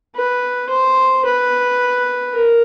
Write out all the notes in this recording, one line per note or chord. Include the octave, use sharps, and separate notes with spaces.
B4
C5
B4
A#4